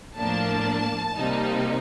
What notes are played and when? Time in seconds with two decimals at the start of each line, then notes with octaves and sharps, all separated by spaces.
0.18 A2 F3 A#3 D4 A5
1.15 C3 G3 A#3 D#4